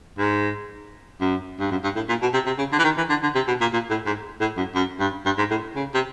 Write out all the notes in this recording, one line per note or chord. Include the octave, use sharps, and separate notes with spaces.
G#2
F#2
G2
F#2
G2
A2
A#2
B2
C3
C3
C#3
D3
E3
D#3
E3
D3
D3
C3
B2
A#2
A#2
A2
G#2
A2
F#2
F#2
G2
G2
G#2
A2
C#3
C3